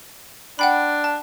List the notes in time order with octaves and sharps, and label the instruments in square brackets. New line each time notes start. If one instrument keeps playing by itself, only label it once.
[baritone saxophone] D4 [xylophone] F#5 G5 B5
[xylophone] A5